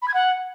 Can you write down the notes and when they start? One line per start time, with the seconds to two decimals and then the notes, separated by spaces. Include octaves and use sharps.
0.02 B5
0.08 G#6
0.14 F#5